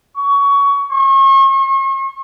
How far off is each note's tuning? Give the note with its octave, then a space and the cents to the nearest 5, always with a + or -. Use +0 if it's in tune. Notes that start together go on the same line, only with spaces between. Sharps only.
C#6 +20
C#6 -40